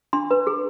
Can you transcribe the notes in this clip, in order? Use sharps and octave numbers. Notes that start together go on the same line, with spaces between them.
D4 C6
B4
G#4